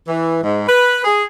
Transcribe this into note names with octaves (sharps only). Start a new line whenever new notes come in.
E3
G#2
B4
G#4